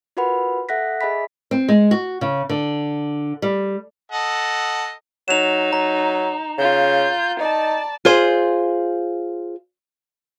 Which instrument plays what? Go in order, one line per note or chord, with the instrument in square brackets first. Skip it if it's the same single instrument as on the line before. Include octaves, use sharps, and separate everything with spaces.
[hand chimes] F4 F#4 A#4 B4 F#5 B5
A4 E5 F#5 F#6 A#6 B6
G#4 D#5 E5 G#5 B5 B6
[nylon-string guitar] C4
G#3
F#4
C#3
D3
G3
[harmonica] A4 D#5 F#5
[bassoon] F#3 [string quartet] D#4 [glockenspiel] E7 F7
[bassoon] F#3 [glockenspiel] A#5
[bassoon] C#3 [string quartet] F4 G6
[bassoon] D#4 [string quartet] D5 A5
[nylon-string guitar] F4 G#4 C5